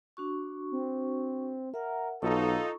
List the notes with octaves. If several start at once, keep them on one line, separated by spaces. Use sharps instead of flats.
D4 F#4 C#6
C4
A#4 E5 F#5
B1 D#4 F4 A4 C#6